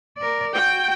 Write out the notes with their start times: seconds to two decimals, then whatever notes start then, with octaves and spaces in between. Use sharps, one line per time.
0.18 A#4 D5
0.55 F#4 G5